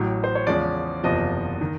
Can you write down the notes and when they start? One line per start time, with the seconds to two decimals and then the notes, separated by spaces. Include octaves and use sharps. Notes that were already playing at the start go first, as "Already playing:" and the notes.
Already playing: A1 A2 F#3
0.24 C5
0.35 C#5
0.47 E2 C#3 F3 G#3 C#4 D5
1.04 F#1 E2 C3 F3 D#5
1.61 D#3